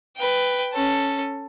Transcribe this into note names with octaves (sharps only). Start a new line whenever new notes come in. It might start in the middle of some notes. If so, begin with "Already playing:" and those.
B4 G5
C#4 A4